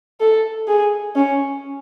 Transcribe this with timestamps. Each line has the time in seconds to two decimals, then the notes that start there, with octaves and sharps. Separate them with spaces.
0.20 A4
0.68 G#4
1.16 C#4